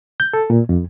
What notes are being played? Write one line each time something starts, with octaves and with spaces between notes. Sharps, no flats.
G6
A4
A#2
F2